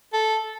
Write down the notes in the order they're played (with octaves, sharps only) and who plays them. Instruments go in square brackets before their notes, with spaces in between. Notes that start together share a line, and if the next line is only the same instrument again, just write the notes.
[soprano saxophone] A4